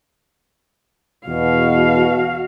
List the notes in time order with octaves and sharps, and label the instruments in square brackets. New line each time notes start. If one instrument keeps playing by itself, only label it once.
[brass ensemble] E2 B2 [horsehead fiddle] F#4 F5